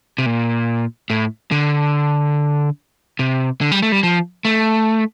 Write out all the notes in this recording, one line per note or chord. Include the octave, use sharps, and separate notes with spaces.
C3
A#2
A2
D3
C3
D3
G3
A3
G3
F3
A3